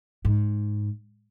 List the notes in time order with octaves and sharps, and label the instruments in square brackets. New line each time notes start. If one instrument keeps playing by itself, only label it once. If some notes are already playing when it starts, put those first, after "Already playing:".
[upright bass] G#2